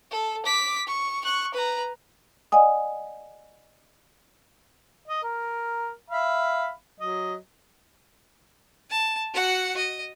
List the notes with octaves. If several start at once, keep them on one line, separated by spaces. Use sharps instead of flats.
A4
D6 B6
C#6
C#6 F#6
B4 A#5
D5 D#5 F#5 G#5 D#6
D#5
A#4
E5 F5 B5
F#3 D#5
A5
F#4 F#5
D#5